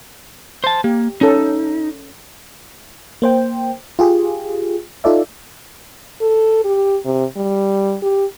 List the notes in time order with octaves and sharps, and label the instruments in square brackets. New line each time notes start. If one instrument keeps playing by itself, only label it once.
[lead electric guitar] C5 A5
[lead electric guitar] A#3 [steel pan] G4
[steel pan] C#4 A4 [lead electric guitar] D#4
[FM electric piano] A#3 C5 G5
F4 G4 G#4
D#4 F4 A4 D5 E5
[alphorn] A4
G4
C3
G3
G4